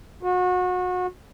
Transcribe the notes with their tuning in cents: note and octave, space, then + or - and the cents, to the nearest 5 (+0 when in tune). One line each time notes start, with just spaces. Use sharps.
F#4 -30